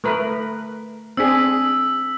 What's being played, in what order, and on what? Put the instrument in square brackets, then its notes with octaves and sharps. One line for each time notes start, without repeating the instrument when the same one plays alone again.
[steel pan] A3 A#4 B4
[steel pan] C4 D4 G#4 [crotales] E6 B6